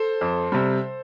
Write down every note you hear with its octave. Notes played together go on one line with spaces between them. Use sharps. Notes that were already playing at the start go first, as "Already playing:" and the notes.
Already playing: A4 C5
F2
C3 G3